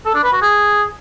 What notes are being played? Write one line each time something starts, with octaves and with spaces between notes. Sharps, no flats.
A4
D4
B4
F#4
G#4